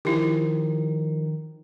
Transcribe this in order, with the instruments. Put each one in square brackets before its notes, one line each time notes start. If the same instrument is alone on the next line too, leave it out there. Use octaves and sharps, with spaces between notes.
[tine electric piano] D#3 F3 [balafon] E4 G4